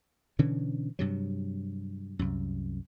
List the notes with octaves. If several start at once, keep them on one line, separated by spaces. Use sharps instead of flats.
B2 D3 E3 C#4
G2 C3 F#3
C2 F#2